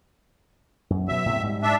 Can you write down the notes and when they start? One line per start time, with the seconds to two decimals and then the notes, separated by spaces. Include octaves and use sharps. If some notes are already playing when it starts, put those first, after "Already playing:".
0.90 F#2
1.08 B2 F#3 E5
1.26 A2 C3
1.43 G#2 G3
1.63 D4 E5